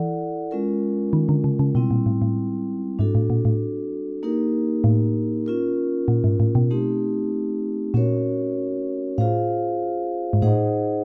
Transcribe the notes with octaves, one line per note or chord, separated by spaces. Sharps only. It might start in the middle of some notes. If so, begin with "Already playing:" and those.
Already playing: E3 E4 A4 D5 F#5
G#3 C#4 F4 A#4
D#3
D3
C#3
C#3
B2 G3 C4 E4
A#2
A2
A2
G#2 D4 F#4 A4
A2
A#2
A2
A#3 D#4 G4 A#4
A2
C#4 F4 A#4
A#2
G#2
A2
B2
A3 C4 D#4 G4
A#2 C#4 F#4 A#4 C#5
A2 F4 G#4 C5 F5
G#2
A2 D#4 G#4 C5 D#5 F#5